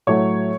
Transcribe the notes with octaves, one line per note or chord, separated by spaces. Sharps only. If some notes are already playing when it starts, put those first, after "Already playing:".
A2 F#3 A3 C#5